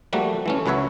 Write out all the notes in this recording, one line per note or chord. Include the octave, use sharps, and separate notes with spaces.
F3 G3 A3 A#3 F#4
E3 A3 C#4
C#2 F#3 B4 C#5 E5